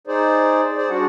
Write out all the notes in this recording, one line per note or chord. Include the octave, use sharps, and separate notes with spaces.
D#4 G#4 C5 D5
G#4 C5 D5
G3 D4 F#4 F#5